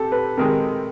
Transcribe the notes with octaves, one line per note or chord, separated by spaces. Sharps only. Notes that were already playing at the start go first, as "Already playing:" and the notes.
Already playing: C3 G4 A4
B4
C3 D#3 G#3 A#4